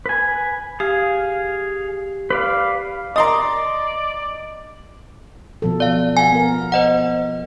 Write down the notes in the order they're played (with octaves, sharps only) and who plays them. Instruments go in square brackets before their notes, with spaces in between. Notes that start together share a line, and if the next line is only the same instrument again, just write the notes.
[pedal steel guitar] B4 G#5
[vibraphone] G4 [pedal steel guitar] G#4 F5
[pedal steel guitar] B4 D5 F5
[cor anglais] D5 [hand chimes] D#5 [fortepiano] A#5 C6 D#6
[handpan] B2 F3 A4
[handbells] D5 F5
F5 F#5 G#5
[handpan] B3 A#4
[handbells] C5 D#5 F#5